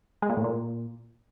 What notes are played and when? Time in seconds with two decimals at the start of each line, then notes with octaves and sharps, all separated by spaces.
0.22 G#3
0.30 A#2
0.37 A2
0.44 A#2